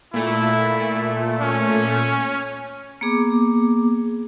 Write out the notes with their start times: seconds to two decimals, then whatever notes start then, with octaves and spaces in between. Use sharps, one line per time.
0.14 A#2 A3 E4
1.41 C#4
3.01 A#3 B3 G#4 D6